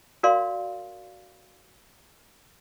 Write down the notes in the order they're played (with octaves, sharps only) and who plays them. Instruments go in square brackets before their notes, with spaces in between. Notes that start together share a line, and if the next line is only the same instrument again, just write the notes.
[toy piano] F#4 A#4 D5 F5 C6